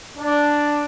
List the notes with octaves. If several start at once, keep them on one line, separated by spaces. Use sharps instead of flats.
D4